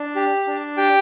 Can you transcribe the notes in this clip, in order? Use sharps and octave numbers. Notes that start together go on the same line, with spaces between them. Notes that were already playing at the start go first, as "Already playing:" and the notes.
Already playing: D4
G4
D4
G4 G5